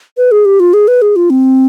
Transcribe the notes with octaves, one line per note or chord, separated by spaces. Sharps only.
B4
G#4
G4
F4
G#4
B4
G#4
F4
C4